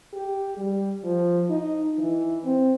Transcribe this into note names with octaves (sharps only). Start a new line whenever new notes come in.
G4
G3
F3
D#4
E3
C4